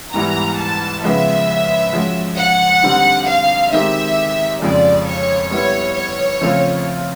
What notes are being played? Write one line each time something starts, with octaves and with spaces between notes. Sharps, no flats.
G#2 E3 G3 B3 E4 A#5
A5
C#3 F3 G#3 B3 E5
F3 G#3 C#4 F#4
F#5
D3 G3 C4 D#4
F5
D#3 G#3 C4 D#4 G4 E5
F2 C#3 F3 G#3 D5
C#5
G3 B3 E4 C#5
C#5
C#3 F3 A3 C4 F4